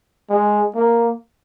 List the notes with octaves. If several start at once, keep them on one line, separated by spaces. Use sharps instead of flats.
G#3
A#3